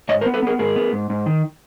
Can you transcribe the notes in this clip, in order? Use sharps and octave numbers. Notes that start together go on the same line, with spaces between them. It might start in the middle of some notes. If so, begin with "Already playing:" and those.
G#2 C#5 D#5
A#4 C5
B3
A4 B4
B3 G#4 A#4
G#2 G#4 A#4
B3
G#2
G#2
D#3